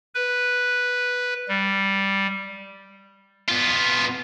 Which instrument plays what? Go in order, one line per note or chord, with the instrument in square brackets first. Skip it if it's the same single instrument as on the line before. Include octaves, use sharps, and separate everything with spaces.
[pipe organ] B4
G3
[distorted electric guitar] B3 F4